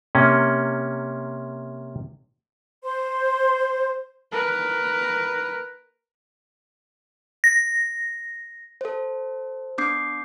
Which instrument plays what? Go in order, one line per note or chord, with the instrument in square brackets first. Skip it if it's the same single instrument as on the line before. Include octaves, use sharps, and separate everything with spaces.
[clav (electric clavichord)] C3 A#3 C#4
[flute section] C5 C6
[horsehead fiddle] A#4 B4
[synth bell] A#6
[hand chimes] A4 C5
B3 D4 D6 G6 C7